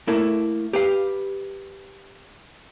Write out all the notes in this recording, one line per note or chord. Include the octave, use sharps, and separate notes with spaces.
A3 A#3 E4 A4
G4 B4 F5